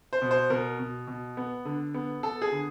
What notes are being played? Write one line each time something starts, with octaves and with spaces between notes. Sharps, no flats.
C5
B2
C5
B2 A#4
B2
B2
B3
D3
B3
B3 A4
G#4
D3